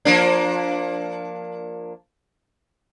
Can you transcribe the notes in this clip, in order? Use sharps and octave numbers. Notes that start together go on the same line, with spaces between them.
F3 A#3 D4